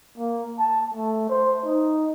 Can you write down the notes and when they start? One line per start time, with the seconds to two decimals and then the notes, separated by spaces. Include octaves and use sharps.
0.18 A#3
0.59 A5
0.94 A3
1.29 C5
1.65 D#4